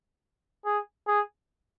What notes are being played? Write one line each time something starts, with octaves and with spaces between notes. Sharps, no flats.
G#4
G#4